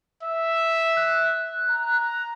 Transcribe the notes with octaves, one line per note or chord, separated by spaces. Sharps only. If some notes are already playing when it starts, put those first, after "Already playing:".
E5
F#6
A#5